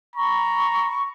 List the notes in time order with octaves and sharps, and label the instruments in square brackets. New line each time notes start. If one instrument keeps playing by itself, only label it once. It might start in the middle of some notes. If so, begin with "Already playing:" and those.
[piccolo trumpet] A#5 [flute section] B5 C#6